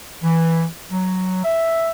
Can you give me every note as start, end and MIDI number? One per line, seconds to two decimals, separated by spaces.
0.23 0.65 52
0.91 1.42 54
1.44 1.91 76